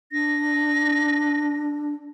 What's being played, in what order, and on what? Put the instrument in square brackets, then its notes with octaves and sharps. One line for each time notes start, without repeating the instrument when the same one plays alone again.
[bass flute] D4 [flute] A#6